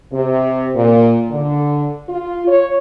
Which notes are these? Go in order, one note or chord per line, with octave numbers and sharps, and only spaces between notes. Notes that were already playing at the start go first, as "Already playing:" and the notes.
C3
A#2
D3
F4
C#5